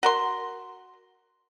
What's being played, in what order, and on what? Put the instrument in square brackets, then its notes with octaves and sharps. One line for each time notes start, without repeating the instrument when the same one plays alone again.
[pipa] F#4 A#4 C6